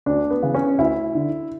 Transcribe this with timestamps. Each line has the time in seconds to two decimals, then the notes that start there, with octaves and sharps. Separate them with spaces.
0.06 D2 D4
0.30 B3
0.43 C#3 E3
0.54 C#4
0.78 D2 E4
1.15 D3